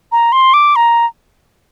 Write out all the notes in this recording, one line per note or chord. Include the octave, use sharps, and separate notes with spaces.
A#5
C6
D6
A#5